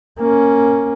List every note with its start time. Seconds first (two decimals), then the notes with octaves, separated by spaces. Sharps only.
0.19 A#3 C#4